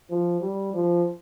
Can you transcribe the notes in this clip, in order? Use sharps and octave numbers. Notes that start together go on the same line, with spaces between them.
F3
G3
F3